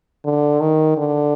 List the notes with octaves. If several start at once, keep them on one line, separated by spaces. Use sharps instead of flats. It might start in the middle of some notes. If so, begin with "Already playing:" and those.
D3
D#3
D3